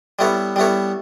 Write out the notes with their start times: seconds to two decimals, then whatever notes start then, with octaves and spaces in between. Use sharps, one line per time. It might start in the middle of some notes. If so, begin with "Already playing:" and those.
0.19 G3 B3 E4 A4 C#5
0.56 G3 B3 E4 A4 C#5